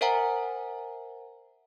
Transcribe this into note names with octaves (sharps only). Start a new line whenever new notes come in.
A#4 C5 E5 F#5 G#5 A#5